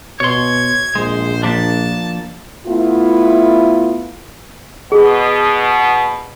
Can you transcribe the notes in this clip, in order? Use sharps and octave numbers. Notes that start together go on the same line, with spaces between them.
B2 C#5 C6 G#6
A#1 G#3 C5
F3 A#3 D4 A5
A3 B3 E4 F4
B2 G#4